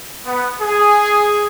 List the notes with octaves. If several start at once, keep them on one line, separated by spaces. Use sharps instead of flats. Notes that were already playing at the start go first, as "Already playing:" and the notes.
B3
G#4